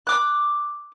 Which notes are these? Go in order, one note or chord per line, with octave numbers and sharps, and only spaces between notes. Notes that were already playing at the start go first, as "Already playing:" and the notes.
D6 F#6